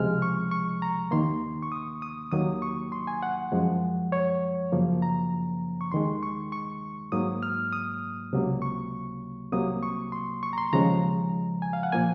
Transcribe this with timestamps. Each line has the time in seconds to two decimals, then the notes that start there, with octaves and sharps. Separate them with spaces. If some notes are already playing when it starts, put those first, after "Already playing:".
Already playing: C#2 C3 F3 G#3 F6
0.22 C#6
0.51 C#6
0.82 A#5
1.11 D#2 D#3 A#3 C6
1.62 C#6
1.72 D#6
2.02 D#6
2.32 D#2 D#3 F#3 A#3 D#6
2.62 C#6
2.92 C6
3.07 G#5
3.23 F#5
3.52 F#2 F3 G#3
4.12 C#5
4.72 F#2 C#3 F3 A#3
5.02 A#5
5.81 C#6
5.92 D#2 D#3 G#3 C6
6.23 C#6
6.52 C#6
7.12 G#2 F#3 A#3 D#6
7.43 F6
7.73 D#6
8.33 C#2 C3 F#3 A#3
8.62 C#6
9.52 C2 C3 F#3 A#3 D#6
9.83 C#6
10.12 C6
10.43 C#6
10.53 A#5
10.58 C6
10.73 D#2 C#3 F3 G#3 A#5
11.62 G#5
11.73 F5
11.83 F#5
11.92 A#2 F3 A#3 G#5